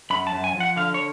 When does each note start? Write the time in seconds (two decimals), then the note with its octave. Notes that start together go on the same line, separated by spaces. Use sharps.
0.10 F#2 B5
0.27 A5
0.32 F#2
0.44 G#5
0.54 F3
0.60 F#5
0.76 D3 F5
0.94 C#5